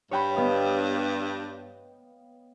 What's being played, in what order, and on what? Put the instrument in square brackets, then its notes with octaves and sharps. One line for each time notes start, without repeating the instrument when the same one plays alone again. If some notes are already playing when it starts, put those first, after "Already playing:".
[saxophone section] G2 [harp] C#5 G5 B5
[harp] B3 D#5 F5